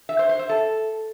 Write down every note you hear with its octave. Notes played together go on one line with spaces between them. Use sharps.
E5
C5
C5
E5
A4